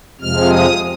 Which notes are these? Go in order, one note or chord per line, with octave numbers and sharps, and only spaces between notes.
F2 C3 F3 G#3 F6
D#6